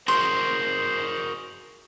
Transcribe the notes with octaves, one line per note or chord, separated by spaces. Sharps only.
F#4 G#4 A#4 C5 C6